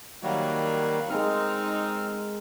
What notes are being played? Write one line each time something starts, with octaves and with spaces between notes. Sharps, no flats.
D#3 F#3 G3 A#3
G#3 C4 D#4 A#4 F6